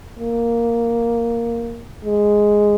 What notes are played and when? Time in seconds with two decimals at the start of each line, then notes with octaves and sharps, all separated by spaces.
0.20 A#3
2.04 G#3